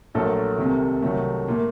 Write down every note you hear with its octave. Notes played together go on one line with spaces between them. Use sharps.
A#1 A#2 F#3 A3 A4
C2 C3 D#3
C2 C3 D#3 F#3 A3
A#2 A3